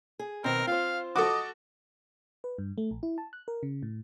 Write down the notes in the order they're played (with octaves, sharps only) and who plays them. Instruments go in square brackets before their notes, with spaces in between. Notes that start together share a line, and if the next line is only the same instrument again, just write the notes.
[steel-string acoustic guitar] G#4
[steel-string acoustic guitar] B2 D#3 [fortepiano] C4 [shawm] A#4
[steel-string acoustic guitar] F4 C5 [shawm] F5
[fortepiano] F#4 [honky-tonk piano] A4 D6 [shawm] D#5
[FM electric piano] B4
G2
A3
A#1
E4
A5
F#6
A#4
C#3
A2